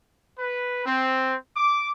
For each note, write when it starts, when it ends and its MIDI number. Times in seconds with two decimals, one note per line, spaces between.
0.39 0.84 71
0.86 1.36 60
1.56 1.91 86